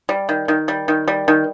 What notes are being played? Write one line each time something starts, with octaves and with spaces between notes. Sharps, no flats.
G3
D#3
D#3
G3
D#3
G3
D#3